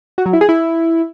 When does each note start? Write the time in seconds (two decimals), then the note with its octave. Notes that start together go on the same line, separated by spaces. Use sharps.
0.18 F#4
0.26 F#3
0.33 E4
0.41 G#4
0.49 E4